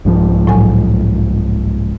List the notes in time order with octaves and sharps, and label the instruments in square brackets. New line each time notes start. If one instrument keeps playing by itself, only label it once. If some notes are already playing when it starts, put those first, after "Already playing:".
[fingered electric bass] C2 G#2 F3
[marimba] A2 F#3 G#5